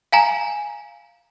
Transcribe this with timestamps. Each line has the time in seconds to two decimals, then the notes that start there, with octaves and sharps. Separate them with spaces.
0.12 F5 G#5 A#5